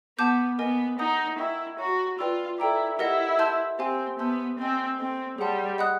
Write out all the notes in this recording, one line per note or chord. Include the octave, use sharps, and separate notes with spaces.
B3 F#5 A5 D6 G6
B3 A#4 D#5 G#5
D#4 F#5 A#5 D#6 G6
E4 A#4 D#5 G5 A#5 C#6
F#4 C#5 F5 A#5
F4 B4 D5 G5 B5 E6
E4 A4 D5 G5 A#5 D6
E4 G4 A#4 D#5 F#5
E5 A5 C6 E6 G6
C4 G4 C5 F5 G#5 C6
B3 E5 A5 C6 E6 G6
C4 C5 D#5 G#5
C4 A4 C5 D#5
G3 G#4 C#5 F#5 A5 C6
D#5 F#5 B5 D#6 F#6